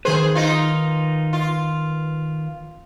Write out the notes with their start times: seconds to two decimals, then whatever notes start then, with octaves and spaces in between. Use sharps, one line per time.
0.05 D#3 G#4 B4 C5
0.35 D#4 F4
1.33 F4